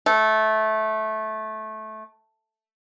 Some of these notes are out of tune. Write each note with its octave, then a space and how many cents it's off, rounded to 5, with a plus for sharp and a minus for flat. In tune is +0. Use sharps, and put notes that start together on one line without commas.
A3 -15